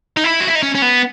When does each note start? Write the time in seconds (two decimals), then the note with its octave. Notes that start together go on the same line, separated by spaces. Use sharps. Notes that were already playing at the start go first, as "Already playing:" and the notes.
0.17 D#4
0.24 E4
0.40 F#4
0.48 E4
0.55 D#4
0.63 C#4
0.75 C#4
0.82 B3